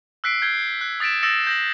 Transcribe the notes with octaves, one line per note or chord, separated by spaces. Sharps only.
E6 F#6 B6 C7 D7
G6 G#6 C7 G7
F#6
D#6 A6 B6 D7 E7
D#6 E6 A6 A#6 C#7 E7
G6 A#6 F#7